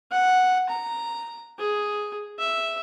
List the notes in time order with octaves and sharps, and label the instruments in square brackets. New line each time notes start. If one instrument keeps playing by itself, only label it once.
[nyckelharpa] F#5
A#5
G#4
E5